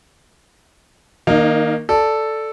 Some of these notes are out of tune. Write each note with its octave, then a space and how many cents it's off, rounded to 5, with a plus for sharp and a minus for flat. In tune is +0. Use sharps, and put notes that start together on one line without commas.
D#3 +15 A#3 +0 D#4 -30
A4 +0 D5 +0